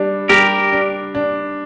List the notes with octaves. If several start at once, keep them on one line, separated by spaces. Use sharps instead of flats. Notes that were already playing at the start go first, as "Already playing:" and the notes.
Already playing: G3 D4
G3 G4 A#4
D4
D4